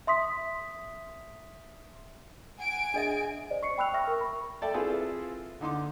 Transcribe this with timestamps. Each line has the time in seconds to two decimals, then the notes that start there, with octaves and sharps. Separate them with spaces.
0.07 E5 C6 D#6 B6
2.59 F#5 G#5 D7
2.94 D4 G#4 D#5 E5
3.50 C5 D5 D#5
3.63 C#6 C7 C#7
3.78 G5 B5 E6 F#6 F7
3.94 E5 G5 C#6 F6 A#6
4.07 A#4 C#6
4.21 B5
4.62 A4 D5 E5 G5 A5
4.74 C4 E4 F4 G#4 A4 B4
5.61 D3 D#4 C6 D6